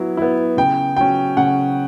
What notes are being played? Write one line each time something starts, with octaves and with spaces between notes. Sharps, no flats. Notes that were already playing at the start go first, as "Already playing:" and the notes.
Already playing: F#3 B3 E4
B3 E4
C#3 G5
F#3 C#4 G5
C#3 F#5